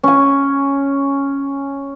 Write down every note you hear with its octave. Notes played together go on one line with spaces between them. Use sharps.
C#4 G#5